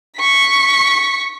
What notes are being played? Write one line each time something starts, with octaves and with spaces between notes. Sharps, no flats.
C#6 B6